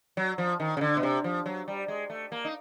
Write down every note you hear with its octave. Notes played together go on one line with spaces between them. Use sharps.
F#3
F3
D#3
C#3
D3
B2
C3
F3
F#3
G3
G#3
A3
A#3
D#4